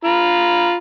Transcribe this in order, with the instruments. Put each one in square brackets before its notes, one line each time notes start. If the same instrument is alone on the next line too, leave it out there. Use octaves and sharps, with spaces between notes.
[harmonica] F4 A#5 B5